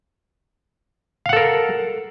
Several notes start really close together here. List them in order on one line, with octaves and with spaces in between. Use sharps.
F5 F#5 A4 A#4